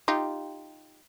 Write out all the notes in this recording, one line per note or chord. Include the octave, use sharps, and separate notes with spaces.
D#4 F4 G4